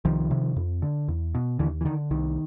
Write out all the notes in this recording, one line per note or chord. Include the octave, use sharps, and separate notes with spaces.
C2 D#3 F3
C3
F2
D3
E2
B2
D#2 D3 E3
E3
D3 D#3
C2 D#3